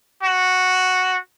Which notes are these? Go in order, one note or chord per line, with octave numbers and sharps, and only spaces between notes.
F#4